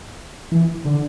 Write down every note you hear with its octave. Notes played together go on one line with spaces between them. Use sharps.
E3
D3